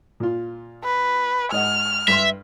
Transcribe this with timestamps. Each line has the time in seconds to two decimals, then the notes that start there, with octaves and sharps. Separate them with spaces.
0.20 A#2 F4
0.84 B4
1.52 G#2 D#5 F#5 F6
2.08 G2 B4 E5 C6